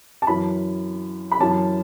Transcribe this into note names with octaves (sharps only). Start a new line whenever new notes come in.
A5
F#2 E3 B5
B5
F#2 E3 A5